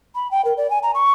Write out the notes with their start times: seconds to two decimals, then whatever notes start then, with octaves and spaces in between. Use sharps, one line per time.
0.15 B5
0.31 G5
0.45 A#4
0.57 D5
0.70 G#5
0.83 A#5
0.95 C#6